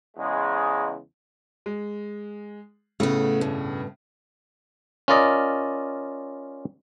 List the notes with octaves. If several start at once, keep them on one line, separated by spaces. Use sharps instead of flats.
E2 C#3 G#3
G#3
A2 C#3 A3 B3
G2 B2
C#4 F4 A#4 D5 D#5